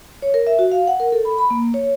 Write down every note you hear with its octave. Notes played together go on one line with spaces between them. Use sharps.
C#5
A#4
E5
F#4
F5
F#5
A#4
A4
B5
B5
A#3
C#5